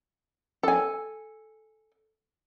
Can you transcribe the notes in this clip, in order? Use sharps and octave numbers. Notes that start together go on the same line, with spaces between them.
A4 G#5